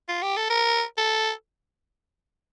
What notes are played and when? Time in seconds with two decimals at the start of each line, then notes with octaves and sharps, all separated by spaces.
0.09 F4
0.22 G4
0.37 A4
0.50 A#4
0.98 A4